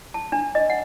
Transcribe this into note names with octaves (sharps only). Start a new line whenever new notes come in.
A5
D4
D#5
F#5